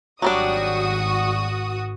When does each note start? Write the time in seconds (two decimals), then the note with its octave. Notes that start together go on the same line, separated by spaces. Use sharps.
0.22 G#1 F#3 G3 D4 F#4 D#6